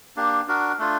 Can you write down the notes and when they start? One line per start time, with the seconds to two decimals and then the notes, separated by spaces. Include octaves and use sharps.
0.16 A#3 D4 G4
0.48 D4 F#4 A#4
0.79 A3 D4 F4